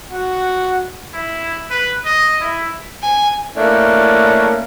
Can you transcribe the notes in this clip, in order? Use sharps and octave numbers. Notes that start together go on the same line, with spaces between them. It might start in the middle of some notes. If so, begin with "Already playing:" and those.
F#4
E4
B4
D#5
E4
G#5
A3 A#3 C#4 D4 E4